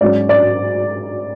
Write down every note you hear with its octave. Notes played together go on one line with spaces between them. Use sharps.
G#2 F#3 C#4 D5
D5